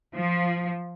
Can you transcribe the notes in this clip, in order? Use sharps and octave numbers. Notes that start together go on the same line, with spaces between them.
F3